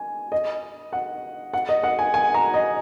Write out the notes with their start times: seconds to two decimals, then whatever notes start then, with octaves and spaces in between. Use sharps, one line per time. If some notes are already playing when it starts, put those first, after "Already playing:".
Already playing: G#5
0.32 D#5
0.93 F#5
1.53 F#5
1.69 D#5
1.83 F#5
1.99 G#5
2.14 G#5
2.34 A#5
2.54 D#5